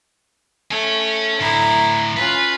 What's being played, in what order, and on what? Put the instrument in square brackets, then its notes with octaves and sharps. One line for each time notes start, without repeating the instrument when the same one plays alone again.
[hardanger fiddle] A3 [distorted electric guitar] C#5 G#5
[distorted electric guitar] D2 A2 [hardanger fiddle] E4 A#5
[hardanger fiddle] C#4 F4 [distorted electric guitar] B4